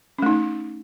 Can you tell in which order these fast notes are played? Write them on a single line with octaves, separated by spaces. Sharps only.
C#4 A3 D#4